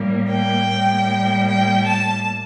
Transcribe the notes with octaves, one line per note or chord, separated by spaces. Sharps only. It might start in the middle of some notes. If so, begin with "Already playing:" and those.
Already playing: A2 G3 A#3
G5
A2 G3 A#3
G5
A5